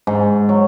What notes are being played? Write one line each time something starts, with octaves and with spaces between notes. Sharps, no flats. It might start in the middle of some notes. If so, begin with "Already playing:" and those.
G#2
F#3